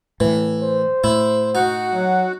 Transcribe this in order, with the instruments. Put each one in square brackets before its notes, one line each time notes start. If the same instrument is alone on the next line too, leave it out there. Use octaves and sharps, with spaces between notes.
[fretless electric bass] A2 [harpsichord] E3
[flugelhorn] C5
[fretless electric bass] A2 [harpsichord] E4
[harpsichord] D#4 [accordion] F#4 F#5
[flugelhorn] F#3